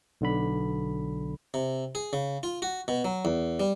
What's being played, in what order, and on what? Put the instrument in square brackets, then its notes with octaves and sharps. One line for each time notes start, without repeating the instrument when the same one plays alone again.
[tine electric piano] B1 D3 B5
[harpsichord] C3
G#4
C#3
F4
F#4
B2
F#3
E2
G3